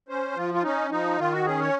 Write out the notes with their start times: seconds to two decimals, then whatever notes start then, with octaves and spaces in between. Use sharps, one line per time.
0.08 C#4 C5
0.36 F3 F4
0.54 F4
0.63 C#4 D#4
0.91 F3 D#4
1.18 D#3 F4
1.32 F#4
1.46 C#4 G#4
1.60 C#5